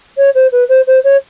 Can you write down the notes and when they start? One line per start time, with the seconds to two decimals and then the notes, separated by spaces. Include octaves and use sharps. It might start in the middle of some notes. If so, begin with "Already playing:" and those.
0.17 C#5
0.35 C5
0.52 B4
0.69 C5
0.87 C5
1.04 C#5